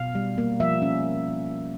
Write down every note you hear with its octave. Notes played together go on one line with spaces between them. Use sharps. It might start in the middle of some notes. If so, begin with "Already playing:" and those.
Already playing: B2 F5
G3
A#3
F3 E5
C#4